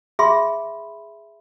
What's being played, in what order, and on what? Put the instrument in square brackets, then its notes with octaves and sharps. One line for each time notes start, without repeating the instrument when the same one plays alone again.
[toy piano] G#4 E5 B5 C6